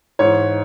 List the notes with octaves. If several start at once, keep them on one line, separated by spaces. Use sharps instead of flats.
G#2 E3 C#5